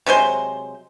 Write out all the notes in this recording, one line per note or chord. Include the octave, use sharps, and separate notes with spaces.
C3 F#3 G#3 C5